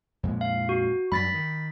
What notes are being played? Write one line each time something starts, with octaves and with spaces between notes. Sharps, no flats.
F2 A#2 G#3
F5
F#4
F#2 G3 B5 A6 B6
D#3